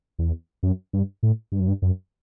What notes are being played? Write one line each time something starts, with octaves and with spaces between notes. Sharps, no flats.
E2
F#2
G2
A2
G2
F#2
G2
F#2